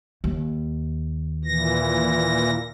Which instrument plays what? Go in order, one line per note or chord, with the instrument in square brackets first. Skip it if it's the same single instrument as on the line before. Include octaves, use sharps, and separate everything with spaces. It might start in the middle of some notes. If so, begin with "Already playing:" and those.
[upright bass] D#2
[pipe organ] A#2 E3 A#6